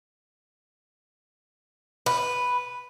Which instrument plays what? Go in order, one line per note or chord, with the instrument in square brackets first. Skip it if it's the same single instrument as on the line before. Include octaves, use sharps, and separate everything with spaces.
[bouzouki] B4